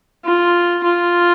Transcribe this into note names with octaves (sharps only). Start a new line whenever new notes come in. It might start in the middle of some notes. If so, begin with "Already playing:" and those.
F4
F4